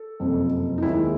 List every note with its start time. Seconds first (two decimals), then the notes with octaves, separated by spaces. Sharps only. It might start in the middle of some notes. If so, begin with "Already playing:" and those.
Already playing: A4
0.20 F#1 F2 C3
0.78 D#4
0.82 D#2 D#3 G#3 E4